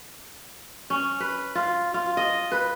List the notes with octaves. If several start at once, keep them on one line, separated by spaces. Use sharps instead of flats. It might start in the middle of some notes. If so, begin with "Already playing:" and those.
C#4
B4
F4
F4
D#5
B4